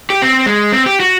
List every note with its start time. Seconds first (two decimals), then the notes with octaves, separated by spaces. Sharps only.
0.10 G4
0.22 C4
0.46 G#3
0.72 C4
0.86 G4
1.00 F#4